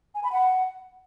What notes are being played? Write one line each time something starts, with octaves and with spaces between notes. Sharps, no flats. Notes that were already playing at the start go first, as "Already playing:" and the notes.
G#5
B5
F#5